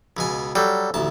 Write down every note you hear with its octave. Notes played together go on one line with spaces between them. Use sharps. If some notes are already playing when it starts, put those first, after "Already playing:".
C#2 B2 G#5
F#3 G3 A4 G5
A1 D2 A5